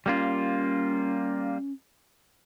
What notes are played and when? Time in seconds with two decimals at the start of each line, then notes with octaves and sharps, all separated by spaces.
0.06 G3 A#3 C#4 F4